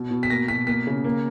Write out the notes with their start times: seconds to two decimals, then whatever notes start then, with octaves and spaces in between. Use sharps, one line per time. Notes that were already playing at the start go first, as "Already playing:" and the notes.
Already playing: B2
0.11 B2
0.23 B6
0.30 A#3 A#6
0.48 B2 B6
0.67 A#3 B6
0.87 C#3
1.04 A#3